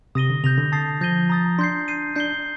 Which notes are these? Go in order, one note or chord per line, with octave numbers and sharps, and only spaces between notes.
C3 D#6 A#6 D#7 G7
D3
C3 G6 A#6 F7
D3
A5 D#6 A6 C7
F3 G6 A#6 D#7 G7
A#5 D#6 A6
D4 C6 G6 C7
G6 C7 D#7
D4 G6 C7 G7